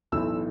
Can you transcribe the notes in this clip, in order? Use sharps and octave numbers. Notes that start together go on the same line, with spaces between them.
B1 A2 E3 E6